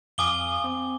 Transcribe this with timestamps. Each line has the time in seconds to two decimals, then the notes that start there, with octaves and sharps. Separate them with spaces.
0.18 F2 F5 G#5 D6 D#6 G7
0.64 C4